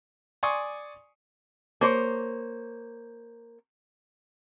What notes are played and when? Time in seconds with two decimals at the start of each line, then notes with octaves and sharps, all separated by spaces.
0.43 D5 G#5 C6 C#6 D#6
1.81 A#3 C5 C#5